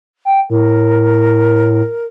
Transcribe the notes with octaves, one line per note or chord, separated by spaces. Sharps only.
G5
A2 A#4